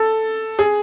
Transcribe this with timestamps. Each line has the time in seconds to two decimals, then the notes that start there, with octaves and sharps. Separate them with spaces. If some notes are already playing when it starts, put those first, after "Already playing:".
Already playing: A4
0.59 G#4